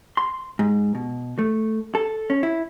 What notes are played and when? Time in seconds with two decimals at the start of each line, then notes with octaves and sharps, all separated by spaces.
0.17 C6
0.59 G#2
0.95 B2
1.39 A3
1.95 A4
2.30 C#4
2.43 E4